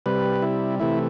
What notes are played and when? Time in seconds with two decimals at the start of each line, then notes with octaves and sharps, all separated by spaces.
0.06 C3 G3 B4
0.42 E4
0.79 C3 E3 A3 E4